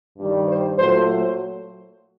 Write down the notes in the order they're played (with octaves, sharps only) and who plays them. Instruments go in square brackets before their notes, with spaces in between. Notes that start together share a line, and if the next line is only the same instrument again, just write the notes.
[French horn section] G2 D#3 G3
C5
A#2 F#3 A3 C5